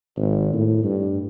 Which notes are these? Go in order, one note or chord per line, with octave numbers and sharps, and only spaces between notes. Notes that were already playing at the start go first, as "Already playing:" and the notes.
G#1
A2
G2